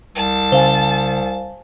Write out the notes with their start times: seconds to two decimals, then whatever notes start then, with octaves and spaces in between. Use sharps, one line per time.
0.15 C2 A5
0.52 C#3 C5 F5 G#5